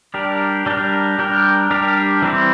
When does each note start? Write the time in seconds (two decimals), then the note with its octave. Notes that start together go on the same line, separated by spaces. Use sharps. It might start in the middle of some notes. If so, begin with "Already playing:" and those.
0.14 G3 D4 G4 A#4
0.66 G3 D4 G4 A#4
1.19 G3 D4 G4 A#4
1.71 G3 D4 G4 A#4
2.22 E3 G3 C4 E4